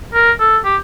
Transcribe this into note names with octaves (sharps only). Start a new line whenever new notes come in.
A#4
A4
G4